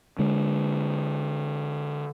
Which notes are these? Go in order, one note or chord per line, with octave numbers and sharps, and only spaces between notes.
D3 G#3